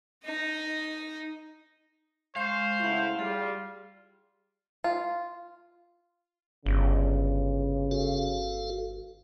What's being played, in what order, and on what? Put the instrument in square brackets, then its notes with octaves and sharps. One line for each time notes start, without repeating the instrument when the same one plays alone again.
[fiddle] D#4 D#5
[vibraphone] G#3 C#6 [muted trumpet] C5 [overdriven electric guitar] F5
[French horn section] C#3 A3 E4 [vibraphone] F#5 C6
[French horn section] G3 [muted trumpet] F4 [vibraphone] G#4
[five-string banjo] F4
[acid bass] G1 [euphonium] C#3
[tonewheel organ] F#4 A4 F5